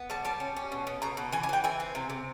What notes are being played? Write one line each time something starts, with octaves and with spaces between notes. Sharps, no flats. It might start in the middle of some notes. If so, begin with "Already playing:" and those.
Already playing: B3
G3 A5
G3 A5
C#4
C#4
B2
B2
B2 A#5
B2
E3 G#5
G#5
E3 G5
E3 G#5
C4
C3
C3